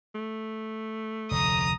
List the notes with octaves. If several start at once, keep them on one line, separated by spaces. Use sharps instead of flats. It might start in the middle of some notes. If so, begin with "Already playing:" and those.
A3
F1 D2 A#5 D#6